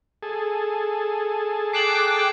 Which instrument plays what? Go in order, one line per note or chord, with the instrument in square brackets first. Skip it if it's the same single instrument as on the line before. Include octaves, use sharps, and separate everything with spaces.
[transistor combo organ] G#4 A4
[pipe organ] G5 D6 F#6 [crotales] C7 E7 F#7